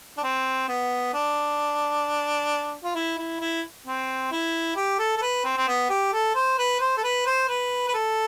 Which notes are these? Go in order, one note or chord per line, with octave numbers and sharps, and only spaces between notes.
D4
C4
B3
D4
F4
E4
E4
E4
C4
E4
G4
A4
A4
B4
C4
C4
B3
G4
A4
C5
B4
C5
A4
B4
C5
B4
B4
A4